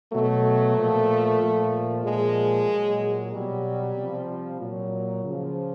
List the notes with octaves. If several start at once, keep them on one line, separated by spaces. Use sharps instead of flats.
B2 F#3 A3
A#2 F3
A#2 F3
A#2 F3 G#3
A#2
F#3
B2 F#3 G3
C3 F3
A#2 F#3
C#3 F3